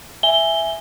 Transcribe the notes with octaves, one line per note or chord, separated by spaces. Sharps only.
E5 G#5 G7